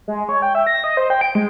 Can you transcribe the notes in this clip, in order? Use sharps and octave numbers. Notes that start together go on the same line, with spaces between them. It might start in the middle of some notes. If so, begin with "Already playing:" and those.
G#3
C#5
G5
E5
A#6
D#5
C5
G5
D7
G#3